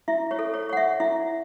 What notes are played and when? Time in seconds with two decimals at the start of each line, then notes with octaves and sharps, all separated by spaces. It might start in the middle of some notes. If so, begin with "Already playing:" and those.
0.08 E4 E5
0.31 C#5
0.39 A4
0.54 C#5
0.69 C#5 F#5
0.77 E5
1.00 E4 E5